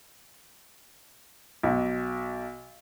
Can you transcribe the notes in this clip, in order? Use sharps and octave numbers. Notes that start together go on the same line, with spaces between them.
B1